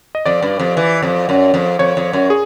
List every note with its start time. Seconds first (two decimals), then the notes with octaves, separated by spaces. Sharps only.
0.15 D#5
0.26 F2 D5
0.42 G2
0.59 F2
0.77 E3
1.02 F2
1.29 F#2
1.54 F2
1.79 F2 C#5
1.97 F2
2.13 F#2
2.30 G#4